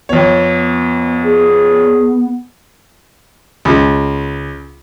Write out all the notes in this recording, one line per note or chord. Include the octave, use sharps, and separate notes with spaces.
F2 B3 C#5
G#4
C#2